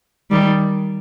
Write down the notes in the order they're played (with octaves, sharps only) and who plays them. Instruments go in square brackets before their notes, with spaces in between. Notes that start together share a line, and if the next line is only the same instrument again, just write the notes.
[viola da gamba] D#3 G3